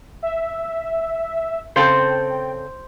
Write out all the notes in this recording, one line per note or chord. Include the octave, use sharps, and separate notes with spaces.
E5
C#3 C4 A4 C5 G5